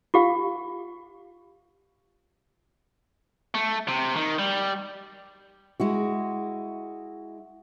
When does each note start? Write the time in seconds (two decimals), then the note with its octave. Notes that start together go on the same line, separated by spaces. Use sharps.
0.14 F4 G4 F5
3.55 A3
3.88 C3
4.16 D#3
4.39 G3
5.80 G#3 E4 F#4